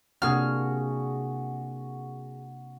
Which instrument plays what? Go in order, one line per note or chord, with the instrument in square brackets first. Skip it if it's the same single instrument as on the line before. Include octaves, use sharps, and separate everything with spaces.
[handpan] C3 A#3 D4 [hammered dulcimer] F#4 [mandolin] G#4 F6